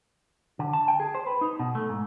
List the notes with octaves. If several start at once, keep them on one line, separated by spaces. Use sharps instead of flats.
D3
A5
G5
G#4
C5
B4
D#4
B2
A3
G#2